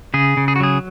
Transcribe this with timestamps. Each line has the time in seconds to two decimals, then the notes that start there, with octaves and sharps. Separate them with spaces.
0.14 C#3 G#4
0.37 C#3
0.48 G#4
0.56 F#4
0.60 F#3 G#4